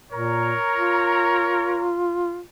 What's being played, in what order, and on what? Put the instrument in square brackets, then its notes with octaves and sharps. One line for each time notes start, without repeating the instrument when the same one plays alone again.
[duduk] A#2 [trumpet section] A#4 C#5 A#5
[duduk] F4